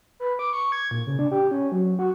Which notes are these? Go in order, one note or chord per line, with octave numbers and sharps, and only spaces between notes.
B4
D6
C#6
G#6
A#2
C#3
D4
G4
C#4
F#3
F#4